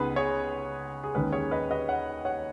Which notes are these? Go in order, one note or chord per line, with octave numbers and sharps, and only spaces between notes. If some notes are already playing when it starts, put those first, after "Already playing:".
Already playing: C#2 C#3 B3 D#4 G#4 B4
G#4 C#5
G#4
D#2 D#3 G#3 C#4 B4
G#4 C#5
B4 D#5
B4 D#5
C#5 F#5
C#5 F#5